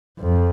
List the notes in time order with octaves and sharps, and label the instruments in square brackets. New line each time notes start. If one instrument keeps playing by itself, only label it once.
[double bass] F2